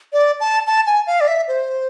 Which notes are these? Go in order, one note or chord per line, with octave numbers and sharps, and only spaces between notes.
D5
A5
A5
G#5
F5
D5
E5
C5